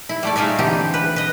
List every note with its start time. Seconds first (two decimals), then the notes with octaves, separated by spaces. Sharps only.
0.09 E4
0.23 G3 A3 D5
0.36 D#4 F4 G#4 D5 E5
0.59 D3 E3 C4 G4
0.94 B4
1.16 B4 D#5